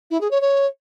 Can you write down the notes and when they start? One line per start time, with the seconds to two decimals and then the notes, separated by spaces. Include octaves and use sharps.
0.11 E4
0.21 G#4
0.31 C#5
0.41 C#5